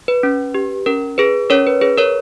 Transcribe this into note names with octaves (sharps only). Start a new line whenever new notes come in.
B4
C#4
G4
C#4 A#4
G#4 B4
C#4 A#4 C#5
B4
G#4 B4
A#4 C#5